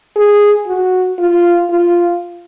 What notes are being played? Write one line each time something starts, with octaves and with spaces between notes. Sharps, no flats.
G#4
F#4
F4
F4